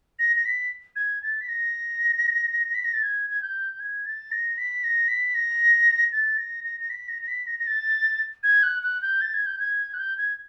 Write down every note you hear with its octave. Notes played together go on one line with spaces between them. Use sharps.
A#6
A#6
B6
G#6
A6
B6
A#6
B6
A#6
A6
G#6
G#6
G6
G#6
A6
A#6
B6
A#6
B6
A#6
A6
A#6
A#6
A#6
B6
A#6
A#6
B6
A#6
A#6
A6
G#6
F#6
F#6
G6
A6
G#6
G6
G#6
F#6
G6
G#6